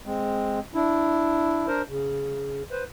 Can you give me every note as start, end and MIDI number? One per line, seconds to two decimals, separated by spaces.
0.06 0.59 56
0.06 0.59 60
0.75 1.67 62
0.75 1.67 64
1.67 1.82 62
1.67 1.82 70
1.67 1.82 72
1.89 2.63 49
2.71 2.83 71
2.71 2.83 72